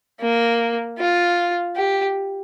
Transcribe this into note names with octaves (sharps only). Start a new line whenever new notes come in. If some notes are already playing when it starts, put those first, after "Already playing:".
A#3
F4
G4